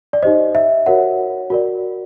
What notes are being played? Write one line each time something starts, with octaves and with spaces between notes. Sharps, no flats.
D5
D#4 G4 C5 D#5
E5
F#4 A#4 C#5 F#5
F#4 A#4 D5